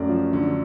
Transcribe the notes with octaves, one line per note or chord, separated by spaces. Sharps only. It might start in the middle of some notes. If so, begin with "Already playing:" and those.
Already playing: F#2 A3 D5
F3
D3